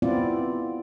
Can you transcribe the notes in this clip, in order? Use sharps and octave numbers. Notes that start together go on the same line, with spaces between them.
B3 C4 E4 F4 D5